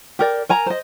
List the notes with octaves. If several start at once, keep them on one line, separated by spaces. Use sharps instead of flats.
G4 A#4 D5
A#4 G#5 A#5
C5 D#5